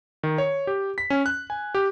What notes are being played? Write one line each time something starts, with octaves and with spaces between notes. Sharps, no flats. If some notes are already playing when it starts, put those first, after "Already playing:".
D#3
C#5
G4
B6
C#4
F#6
G#5
G4